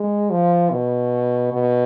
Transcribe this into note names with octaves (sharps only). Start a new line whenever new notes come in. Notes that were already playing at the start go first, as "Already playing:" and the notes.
Already playing: G#3
F3
B2
B2